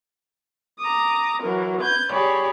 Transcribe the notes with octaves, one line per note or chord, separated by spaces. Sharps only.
A#5 D6 D#6
E3 F#3 A#4
B4 G6 G#6
G4 G#4 C#5 D5 B5